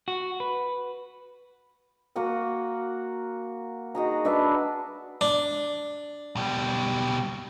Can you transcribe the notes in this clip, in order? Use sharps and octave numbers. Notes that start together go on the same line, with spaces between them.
F#4
B4
A#3 F#4 F#5 G#5
D#4 F#4 G#4 A#5
D4 B4 E5 A5
D4
B2 G3